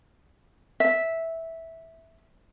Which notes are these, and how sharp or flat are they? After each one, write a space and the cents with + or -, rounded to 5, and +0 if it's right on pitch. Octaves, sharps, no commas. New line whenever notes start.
E5 -10